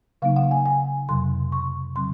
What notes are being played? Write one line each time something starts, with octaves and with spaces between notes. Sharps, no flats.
C#3 F#3 A#3 D#4 F5
F#5
G#5
G#5
F2 C3 F#3 C6
C#6
C#3 F#3 C4 C6